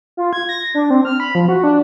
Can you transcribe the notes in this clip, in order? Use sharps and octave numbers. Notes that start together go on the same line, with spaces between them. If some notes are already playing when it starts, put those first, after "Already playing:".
F4
G#6
A#6
D4
C4
F6
B5
F3
F#4
D4